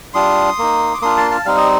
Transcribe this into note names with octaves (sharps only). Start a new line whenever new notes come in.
G3 D4 F4 C6 D#6
A#3 D#4
D6
A#3 D4 F4 C6 D#6
A5 C6
F5 A5
G3 C4 D#4 F5
D#5